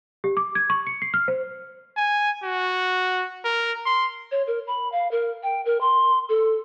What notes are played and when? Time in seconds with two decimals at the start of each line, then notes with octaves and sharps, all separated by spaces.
0.24 G4
0.37 D6
0.55 G#6
0.70 C#6
0.87 C#7
1.02 C7
1.14 F6
1.28 C5
1.97 G#5
2.43 F#4
3.45 A#4
3.86 C6
4.31 C#5
4.47 A#4
4.67 B5
4.92 F5
5.11 A#4
5.43 G5
5.65 A#4
5.81 C6
6.29 A4